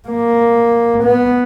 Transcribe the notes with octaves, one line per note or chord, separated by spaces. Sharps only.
A#3
B3